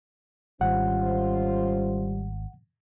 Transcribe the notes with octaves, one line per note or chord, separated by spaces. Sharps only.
G#1 G3 C#4 F4 C5 F#5